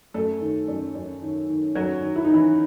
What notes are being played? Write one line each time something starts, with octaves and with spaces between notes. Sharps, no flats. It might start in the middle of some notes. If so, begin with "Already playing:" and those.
F#2 A3 A4
D#3
F#2
F#2
D#3
D#3
F#2 F#3 F#4
D#3
E4
D#4
D#3 E3 E4